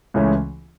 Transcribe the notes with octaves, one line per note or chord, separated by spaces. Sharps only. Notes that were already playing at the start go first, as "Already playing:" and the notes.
C#2 C#3 E3 A3 C#4